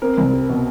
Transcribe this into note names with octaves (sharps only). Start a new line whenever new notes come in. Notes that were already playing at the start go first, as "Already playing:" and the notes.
C4 A#4
C2
G3
B2